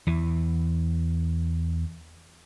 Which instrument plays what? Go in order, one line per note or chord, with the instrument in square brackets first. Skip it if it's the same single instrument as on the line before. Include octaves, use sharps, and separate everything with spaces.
[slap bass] E2 E3